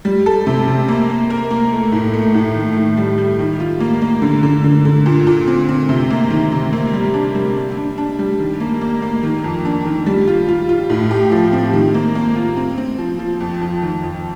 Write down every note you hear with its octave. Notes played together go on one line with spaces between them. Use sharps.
G3
A4
C3
C3
A#3
A#3
A#4
A#3
A3
A2
A3
A2
D#3
D#3
G3
G3
D#3
F4
A#3
A#3
D3
D3
D3
D3
A#2
A#2
C4
C4
C3
A#3
D#3
C3
A#3
G3
D4
G3
D4
D4
D4
G3
D#3
A#3
A#3
A#3
D#3
F2
D4
D#3
G3
F4
F4
F4
A2
G4
F3
C4
D#3
A#3
A#3
F4
C4
C4
F3
F3
F2
F2
D#3
F2